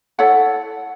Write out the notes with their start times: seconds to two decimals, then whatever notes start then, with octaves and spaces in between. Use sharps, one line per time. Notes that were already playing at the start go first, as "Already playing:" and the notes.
0.19 E4 A4 C#5 F#5